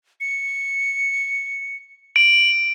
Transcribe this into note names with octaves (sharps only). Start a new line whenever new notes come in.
C#7
D7 F#7